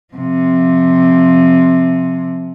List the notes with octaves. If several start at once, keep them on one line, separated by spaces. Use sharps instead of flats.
C3 F3